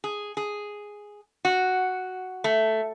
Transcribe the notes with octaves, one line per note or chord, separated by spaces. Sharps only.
G#4
G#4
F#4
A3